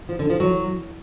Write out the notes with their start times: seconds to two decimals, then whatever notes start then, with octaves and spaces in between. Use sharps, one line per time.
0.09 F3
0.19 D3
0.30 F3
0.40 F#3